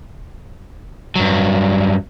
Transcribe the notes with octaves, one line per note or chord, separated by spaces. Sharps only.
G2 F#3